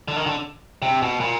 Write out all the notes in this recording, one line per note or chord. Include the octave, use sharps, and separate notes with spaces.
D3
D#3
D3
C3
B2
A#2